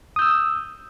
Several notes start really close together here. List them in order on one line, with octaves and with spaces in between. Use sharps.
D#6 G6 E6